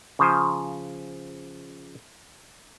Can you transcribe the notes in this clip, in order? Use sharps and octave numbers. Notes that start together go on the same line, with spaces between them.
C#3 F3 C5 G#5